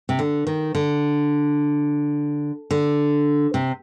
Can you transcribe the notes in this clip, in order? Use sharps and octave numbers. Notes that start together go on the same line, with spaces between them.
C3
D3
D#3
D3
D3
C3